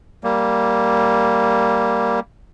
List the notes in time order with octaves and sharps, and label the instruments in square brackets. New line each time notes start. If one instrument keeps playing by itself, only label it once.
[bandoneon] G3 A#3